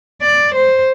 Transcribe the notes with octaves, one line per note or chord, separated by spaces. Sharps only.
D5
C5